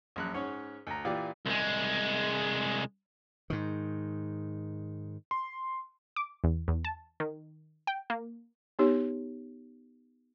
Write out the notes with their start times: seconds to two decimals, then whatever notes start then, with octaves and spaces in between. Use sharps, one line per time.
0.16 A#1 F#2 F#6
0.34 G#2 C#4 C#5 F#5
0.87 D2 A#5
1.05 A#2 E3 F4 G4 D5
1.46 C2 G#3
3.50 G#2 D#3
5.31 C6
6.16 D6
6.44 E2
6.68 E2
6.84 A5
7.20 D#3
7.87 G5
8.10 A#3
8.79 B3 D#4 G4 C#5